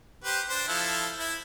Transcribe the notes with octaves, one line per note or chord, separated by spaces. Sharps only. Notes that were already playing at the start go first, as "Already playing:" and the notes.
G4 B4 C5
D4 C5
F3 E4 A4
E4